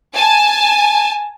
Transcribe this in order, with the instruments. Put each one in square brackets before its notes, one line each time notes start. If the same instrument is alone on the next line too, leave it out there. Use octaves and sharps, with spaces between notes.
[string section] G#5 A5